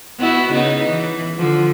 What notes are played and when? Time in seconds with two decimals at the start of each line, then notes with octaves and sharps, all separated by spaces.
0.18 B3 E4 F#4
0.51 C#3 B3 D#4
0.88 E3
1.37 D3 F3